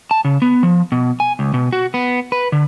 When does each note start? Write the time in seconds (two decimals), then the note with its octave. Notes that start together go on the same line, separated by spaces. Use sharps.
0.11 A5
0.25 C#3
0.42 B3
0.63 F3
0.92 B2
1.20 G#5
1.39 C#2
1.54 B2
1.73 F#4
1.94 B3
2.32 B4
2.52 D3